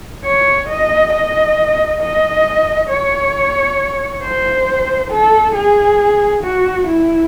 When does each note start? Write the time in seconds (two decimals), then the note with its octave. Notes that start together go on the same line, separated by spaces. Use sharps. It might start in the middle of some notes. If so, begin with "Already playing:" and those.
0.25 C#5
0.69 D#5
1.13 D#5
2.01 D#5
2.90 C#5
4.22 C5
5.11 A4
5.54 G#4
6.43 F#4
6.87 E4